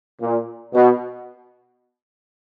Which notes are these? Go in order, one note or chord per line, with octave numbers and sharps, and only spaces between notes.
A#2
B2